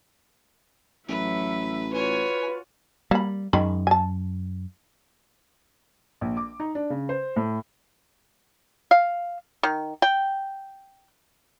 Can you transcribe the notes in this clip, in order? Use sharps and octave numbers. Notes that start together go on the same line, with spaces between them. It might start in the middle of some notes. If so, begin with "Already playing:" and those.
A1 F#3 B4 E5
F4 F#4 B4 C#5 G#5
G3 A#3 B5
F#2 D#3 G#3 B5
G#5 A5
A#1
D6
D#4
D4
C#3
C5
A2
F5
D#3
G5